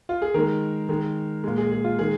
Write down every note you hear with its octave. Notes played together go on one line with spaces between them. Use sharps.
F4
G#4
D#3 G#3 A#4
D#3 G#3
A#2 G#3
G#4
G#4
F4
D#3 G#3 G#4